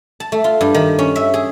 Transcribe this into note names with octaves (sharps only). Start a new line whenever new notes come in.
A5
A3
F4
G2
D#3
C#4
E5
G#4